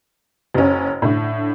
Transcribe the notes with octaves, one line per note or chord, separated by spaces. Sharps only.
F#1 C#4
A2 D3